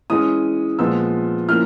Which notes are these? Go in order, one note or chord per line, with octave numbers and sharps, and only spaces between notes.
E3 G#3 C#4 D#6
A#2 F3 G#3 B3 E6
F3 A#3 C#4 E4 F6